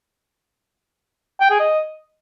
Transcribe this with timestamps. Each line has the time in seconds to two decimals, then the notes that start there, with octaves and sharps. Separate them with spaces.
1.41 G5
1.50 G#4
1.60 D#5